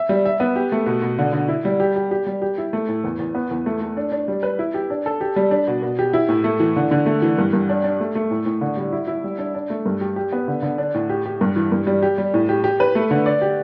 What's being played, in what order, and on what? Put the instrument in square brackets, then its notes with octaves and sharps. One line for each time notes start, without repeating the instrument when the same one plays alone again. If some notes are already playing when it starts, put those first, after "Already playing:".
Already playing: [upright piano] E5
G3
E5
B3
G4
A3
B2
B2
D3
D3
E4
G3
G4
G4
G4
G3
G4
E4
A3
A2
E2
E2
B3
E2
A3
A3
D4
D4
G3
B4
E4
G4
D4
A4
G4
G3
D4
B2
B2
G4
E4
A2
A3
E3
D3
D3
A3
E3
G2
G2
D4
D4
A3
A3
A2
A2
D3
G3
E4
E4
G3
D4
D4
A3
G2
G4
G4
B3
D3
D3
D4
A2
G4
G4
G2
E3
G2
G3
G4
G3
A2
G4
G4
B4
A3
D3
D5
G4